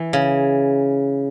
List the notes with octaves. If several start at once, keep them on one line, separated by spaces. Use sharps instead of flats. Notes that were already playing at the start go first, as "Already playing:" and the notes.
Already playing: E3
C#3